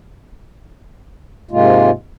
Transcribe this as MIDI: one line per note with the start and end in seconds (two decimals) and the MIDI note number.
1.51 1.90 44
1.51 1.90 48
1.51 1.90 56
1.51 1.90 58
1.51 1.90 65